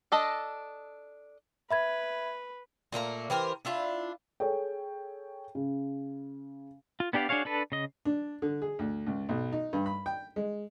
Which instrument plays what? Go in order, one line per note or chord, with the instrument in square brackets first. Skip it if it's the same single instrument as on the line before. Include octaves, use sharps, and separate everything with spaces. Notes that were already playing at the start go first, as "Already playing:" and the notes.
[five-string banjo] D4 A4 D#5
[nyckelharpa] B4 [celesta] E5 B5 G#6
[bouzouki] A#2 A3 A#3 A#5
E3 G4 A#4 C5
D4 E4 F4 E5
[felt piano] G#4 A4 C#5 G5
C#3
[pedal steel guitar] F4
B3 D4 G4 D5 F5
D4 F#4 G#4 C#5 F5
D4 A4 B4
C#3 D#5
[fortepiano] D4
D3
G#4
D2
C#2
B1
D#4
G2
B5
G5
G#3